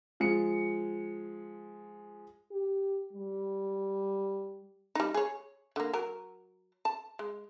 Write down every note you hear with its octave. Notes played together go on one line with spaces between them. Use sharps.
F3 G#3 C#7
G4
G3
G3 D#4
G#4 C#5
D3 A#3
F#3 A#4
A5
G#3